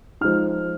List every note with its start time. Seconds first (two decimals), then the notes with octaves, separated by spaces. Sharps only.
0.21 F3 G#3 D#4 F6